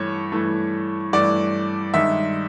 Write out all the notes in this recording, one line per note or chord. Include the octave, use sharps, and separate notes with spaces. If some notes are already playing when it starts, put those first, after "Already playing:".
Already playing: G2 E3 A3 C#5
G2 E3 A3
G2 E3 A3 D5
G2 D#3 G#3 E5